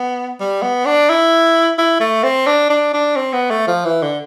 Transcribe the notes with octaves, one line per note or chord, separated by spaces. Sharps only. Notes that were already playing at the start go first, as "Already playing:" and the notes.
Already playing: B3
G3
B3
D4
E4
E4
A3
C4
D4
D4
D4
C4
B3
A3
F3
E3
D3